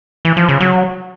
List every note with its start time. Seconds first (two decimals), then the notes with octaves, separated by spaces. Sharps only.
0.25 E3
0.37 F3
0.49 C#3
0.60 F#3